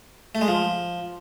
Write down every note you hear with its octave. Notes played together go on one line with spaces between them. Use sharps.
A3
G#3
F3